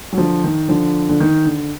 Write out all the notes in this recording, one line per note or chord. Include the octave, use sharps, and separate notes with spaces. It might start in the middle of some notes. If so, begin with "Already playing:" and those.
F#3
D3 F3
D#3
D3 F3
D3
D#3
D3